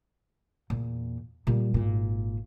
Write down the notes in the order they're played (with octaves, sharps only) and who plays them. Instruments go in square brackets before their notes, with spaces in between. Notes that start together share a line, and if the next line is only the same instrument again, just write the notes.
[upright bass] E2 A#2
A#2 G3
G#1 A#2